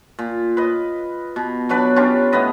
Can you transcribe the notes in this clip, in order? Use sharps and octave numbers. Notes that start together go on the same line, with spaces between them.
A#2
B4 D#5
B2
B2 F#3 D4 B4
C#4 D4 F4 G4
A2 B3 B4 D#5